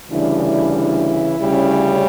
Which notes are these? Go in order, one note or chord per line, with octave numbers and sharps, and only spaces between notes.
D2 C#3 E3 G3 D4 E4
E4
E4
D2 C#3 G3 C#4